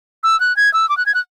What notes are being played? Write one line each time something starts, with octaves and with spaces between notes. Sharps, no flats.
E6
F#6
G#6
E6
D6
F#6
G#6
F#6